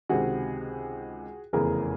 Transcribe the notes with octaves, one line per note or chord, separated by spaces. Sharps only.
C#2 C3 D#3 F#4 G#4
F1 E2 C#3 E3 G#4 A#4